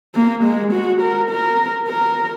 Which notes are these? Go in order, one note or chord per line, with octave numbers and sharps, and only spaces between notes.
A#3
G#3
F#4
A#4
A#4
A#4